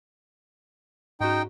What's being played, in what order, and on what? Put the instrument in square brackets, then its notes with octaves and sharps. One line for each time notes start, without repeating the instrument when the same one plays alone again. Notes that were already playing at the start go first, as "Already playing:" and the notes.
[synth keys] G#2 C#4 F#4 [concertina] D#4 G5